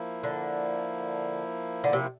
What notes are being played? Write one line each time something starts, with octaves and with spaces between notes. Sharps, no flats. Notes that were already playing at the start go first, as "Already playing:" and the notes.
Already playing: F3 A#3 E4
D3
D3
C3